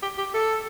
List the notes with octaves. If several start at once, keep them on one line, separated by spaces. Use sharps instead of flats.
G4
G4
A4